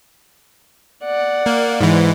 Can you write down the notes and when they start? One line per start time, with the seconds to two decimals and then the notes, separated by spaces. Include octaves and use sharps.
1.04 D5 F#5
1.46 A#3
1.81 G#2 E3